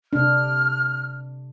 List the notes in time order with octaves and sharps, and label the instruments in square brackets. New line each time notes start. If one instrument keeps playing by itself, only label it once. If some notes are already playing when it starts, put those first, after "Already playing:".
[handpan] C3 D4 [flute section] F6